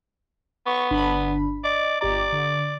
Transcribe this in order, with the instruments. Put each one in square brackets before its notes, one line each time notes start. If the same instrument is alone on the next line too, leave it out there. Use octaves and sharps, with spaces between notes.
[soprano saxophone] B3 [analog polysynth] C#6
[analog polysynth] G1 D4 B5
[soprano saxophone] D5 [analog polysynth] D#5
[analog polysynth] G1 G4 A#5 [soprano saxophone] D5
[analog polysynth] D3